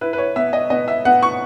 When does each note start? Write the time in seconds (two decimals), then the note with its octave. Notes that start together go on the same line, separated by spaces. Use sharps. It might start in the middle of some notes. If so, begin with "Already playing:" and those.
0.01 E4 B4
0.13 B4
0.18 C#5
0.36 B3 E5
0.53 D#5
0.70 B3 D#5
0.88 E5
1.05 B3 F#5
1.23 C#6